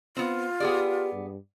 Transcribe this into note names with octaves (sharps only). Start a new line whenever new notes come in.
B3 C4 F4
B3 G4 G#4 D5
G2